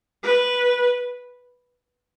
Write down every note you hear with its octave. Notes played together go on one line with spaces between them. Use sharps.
B4